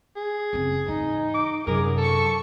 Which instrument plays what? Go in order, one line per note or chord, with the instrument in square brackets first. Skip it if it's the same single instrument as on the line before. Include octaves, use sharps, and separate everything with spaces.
[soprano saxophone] G#4
[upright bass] F#1 C4
[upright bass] G#2 E3 [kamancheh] D#4
[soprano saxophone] D6
[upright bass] F#2 C3 [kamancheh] G#4 [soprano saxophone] A#4
[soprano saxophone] A4 [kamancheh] A5 C#6